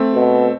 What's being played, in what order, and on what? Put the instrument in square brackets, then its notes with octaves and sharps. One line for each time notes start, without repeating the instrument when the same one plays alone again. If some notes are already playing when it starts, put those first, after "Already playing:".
Already playing: [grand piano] A3 C4
[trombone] B2